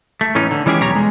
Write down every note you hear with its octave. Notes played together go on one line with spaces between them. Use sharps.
A3
A2 E3 C#4 D#4
D3
E3 G#3 C#4 G4 G#4
B1 E2 G3 C#5 A#5
G#3